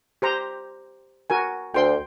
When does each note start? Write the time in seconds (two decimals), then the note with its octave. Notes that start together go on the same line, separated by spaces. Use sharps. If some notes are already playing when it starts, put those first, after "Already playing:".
0.22 G4 C5 A#5
1.30 F#4 A#4 G#5
1.74 D2 G5 C6